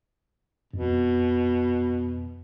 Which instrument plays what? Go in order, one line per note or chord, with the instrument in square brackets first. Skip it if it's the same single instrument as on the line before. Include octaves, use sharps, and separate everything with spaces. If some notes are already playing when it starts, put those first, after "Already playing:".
[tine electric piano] F2 [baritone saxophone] B2